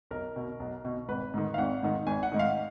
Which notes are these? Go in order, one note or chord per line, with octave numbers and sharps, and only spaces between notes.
B1 A#4
B2
B1
B2
G#1 B4
G#2 D#3
F5
G#1 F#5
G#2 D#3
G#1 G#5
F#5
G#2 D#3
F5